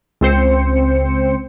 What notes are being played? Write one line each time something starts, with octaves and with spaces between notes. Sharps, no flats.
C#2 C4 C5 C#7